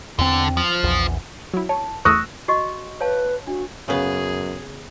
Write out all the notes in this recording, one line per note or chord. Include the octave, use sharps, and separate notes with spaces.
E2 D3 C4
F3
A#1 E2
F#3 E4
C#5 A5
E2 A3 C#6 D#6 E6 F#6 A#6
F#4 D#5 C#6
B4 C#5 F5 A5
D4 F#4
F#2 C#3 B3 G#4